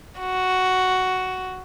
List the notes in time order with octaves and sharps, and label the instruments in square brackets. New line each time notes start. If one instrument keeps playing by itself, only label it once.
[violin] F#4